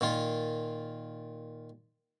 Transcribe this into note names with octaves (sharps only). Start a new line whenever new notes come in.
A#2 D#3 F4